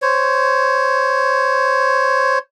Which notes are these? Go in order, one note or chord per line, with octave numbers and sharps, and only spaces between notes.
C5 C#5